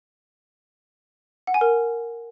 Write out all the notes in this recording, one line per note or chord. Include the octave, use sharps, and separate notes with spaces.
F#5
G#5
A#4